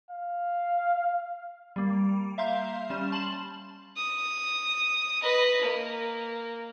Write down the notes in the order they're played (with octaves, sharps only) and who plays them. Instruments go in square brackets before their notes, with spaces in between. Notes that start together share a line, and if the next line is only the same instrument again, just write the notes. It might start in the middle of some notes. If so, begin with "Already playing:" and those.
[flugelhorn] F5
[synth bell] G3 A#3
E5 F5 A#5 C6 G6
G3 C#4 E7
A5 C6 E7 F#7
[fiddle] D#6
B4 D#5
A#3